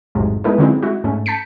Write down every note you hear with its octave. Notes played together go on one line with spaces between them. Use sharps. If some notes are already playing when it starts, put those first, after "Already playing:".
A1 F2 G#2 C3 F#3 G#3
G#3 B3 D#4 E4 A4 B4
D3 F#3 G#3 C4 E4
G#3 E4 F#4
G#2 A3 C#4
A5 G6 B6 C#7